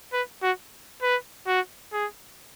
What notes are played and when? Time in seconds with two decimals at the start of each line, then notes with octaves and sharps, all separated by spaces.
0.13 B4
0.42 F#4
1.02 B4
1.47 F#4
1.92 G#4